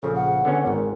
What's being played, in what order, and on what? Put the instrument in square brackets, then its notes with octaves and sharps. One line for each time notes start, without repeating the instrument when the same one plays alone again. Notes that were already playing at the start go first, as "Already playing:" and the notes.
[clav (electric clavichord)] A#1 C#3 F3 [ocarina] A4
[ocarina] F#5
[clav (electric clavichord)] D3 B3 C#4
[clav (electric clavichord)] G#1 G#2 [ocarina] A#4